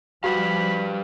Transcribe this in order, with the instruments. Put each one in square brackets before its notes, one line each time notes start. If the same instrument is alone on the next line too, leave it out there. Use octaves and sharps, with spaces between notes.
[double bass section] F3 G3 [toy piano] F#4 F#5 [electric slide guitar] G4 B4 F5 [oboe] B5